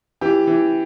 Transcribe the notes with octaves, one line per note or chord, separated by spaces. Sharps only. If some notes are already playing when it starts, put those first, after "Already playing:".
E3 G4
E3